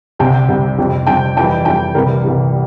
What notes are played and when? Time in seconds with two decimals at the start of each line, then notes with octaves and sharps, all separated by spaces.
0.19 C2 C3 G3 G5
0.48 C2 C3 G3
0.78 F2 C3 G3
1.07 F2 C3 G3 G5
1.37 F2 E3 G3 G5
1.65 F2 E3 G3 G5
1.95 C2 C3 E3 G3 A#4
2.24 C2 C3 E3 G3